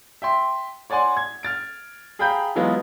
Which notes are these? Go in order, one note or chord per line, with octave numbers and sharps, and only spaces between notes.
E5 G5 C6
C#5 D5 F#5 G#5 C6
G#6
F6 A6 D7
G#4 F5 G5 A#5 B5 G6
E3 F#3 G#3 B3 F4